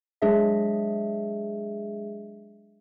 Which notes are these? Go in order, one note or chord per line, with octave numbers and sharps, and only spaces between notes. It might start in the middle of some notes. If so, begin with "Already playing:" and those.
F#3 G#3 D4 G#4 D#5 E5